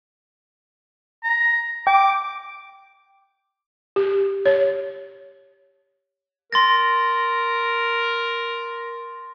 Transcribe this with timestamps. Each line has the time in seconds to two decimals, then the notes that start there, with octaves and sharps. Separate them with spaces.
1.24 A#5
1.87 G5 D6
3.96 G4
4.46 C#5
6.52 A#4 C6 A6 A#6